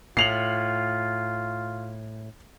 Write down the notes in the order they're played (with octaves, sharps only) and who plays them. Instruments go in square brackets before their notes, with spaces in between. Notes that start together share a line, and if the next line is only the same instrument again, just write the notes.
[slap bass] A2 [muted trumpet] F4 [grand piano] C7 F7 F#7